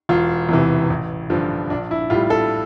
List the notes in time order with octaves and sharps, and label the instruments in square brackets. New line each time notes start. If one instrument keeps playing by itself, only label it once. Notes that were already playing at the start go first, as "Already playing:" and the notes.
[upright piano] E1 F4
E2 C3 E3
A1
G2 D3 F3
A#1 D4
E4
A2 G3 F4
A4